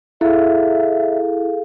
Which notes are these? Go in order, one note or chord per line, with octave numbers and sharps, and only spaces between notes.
E4 G#4 A4 E5 F5